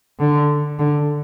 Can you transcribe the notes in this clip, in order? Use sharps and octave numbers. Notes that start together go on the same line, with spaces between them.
D3
D3